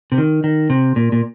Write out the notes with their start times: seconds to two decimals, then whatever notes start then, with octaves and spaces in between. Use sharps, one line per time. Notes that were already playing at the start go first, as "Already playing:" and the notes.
0.12 C3
0.18 D#3
0.44 D#3
0.70 C3
0.96 A#2
1.12 A#2